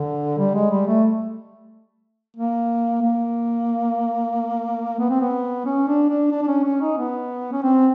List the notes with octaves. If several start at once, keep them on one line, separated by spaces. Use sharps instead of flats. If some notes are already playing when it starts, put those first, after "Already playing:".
Already playing: D3
G3
G#3
G3
A3
A#3
A#3
B3
C4
B3
C#4
D4
D4
D4
D4
C#4
C#4
D#4
B3
C#4
C4